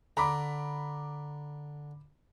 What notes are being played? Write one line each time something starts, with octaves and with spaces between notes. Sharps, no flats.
D3 A#5 B5 D6